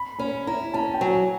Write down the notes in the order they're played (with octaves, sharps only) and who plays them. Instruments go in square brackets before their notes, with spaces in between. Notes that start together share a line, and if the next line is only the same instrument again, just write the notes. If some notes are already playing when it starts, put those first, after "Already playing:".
Already playing: [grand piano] B5
[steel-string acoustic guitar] C#4 [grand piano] B5
[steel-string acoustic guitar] E4 [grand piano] A#5
[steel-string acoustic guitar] C#4 [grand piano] A5
[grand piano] G5
[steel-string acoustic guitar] F#3 [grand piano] G#5